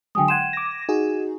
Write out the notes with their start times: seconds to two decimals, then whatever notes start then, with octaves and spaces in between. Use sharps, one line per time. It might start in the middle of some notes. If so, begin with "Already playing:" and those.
0.15 D3 F#3 G#3 G5 G#5 D#6
0.28 F#5 G5 C6 G#6 D#7 E7
0.53 D6 A#6
0.89 D#4 F#4 G#4